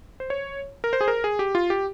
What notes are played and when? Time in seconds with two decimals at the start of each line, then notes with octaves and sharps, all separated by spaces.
0.20 C5
0.30 C#5
0.84 A#4
0.93 C5
1.01 G#4
1.08 A#4
1.24 G#4
1.39 G4
1.55 F4
1.70 G4